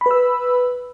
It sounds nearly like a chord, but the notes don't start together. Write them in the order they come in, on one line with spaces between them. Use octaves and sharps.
B5 B4 E6